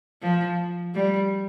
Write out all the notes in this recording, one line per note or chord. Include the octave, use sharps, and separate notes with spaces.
F3
G3